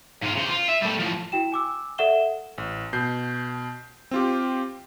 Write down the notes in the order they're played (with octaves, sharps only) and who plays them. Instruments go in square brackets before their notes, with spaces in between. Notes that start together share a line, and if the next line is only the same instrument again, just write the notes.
[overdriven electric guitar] G#2 F4
C#3 C5
F4
E5
G3 A3
A2 F3
[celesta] E4 F#4 G5 E7
G#5 D6 E6
A4 D5 E5 F#5 E7 G7
[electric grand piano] A1
B2 G6 C7
C4 F4 G4